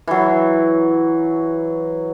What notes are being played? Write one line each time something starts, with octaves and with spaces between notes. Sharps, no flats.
E3 F#3